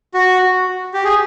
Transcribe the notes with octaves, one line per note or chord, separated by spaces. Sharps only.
F#4
G4
G#4